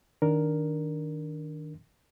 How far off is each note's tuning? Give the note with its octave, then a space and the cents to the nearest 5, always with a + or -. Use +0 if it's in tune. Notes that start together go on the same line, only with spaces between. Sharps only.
D#3 +0 D4 -5 A#4 +0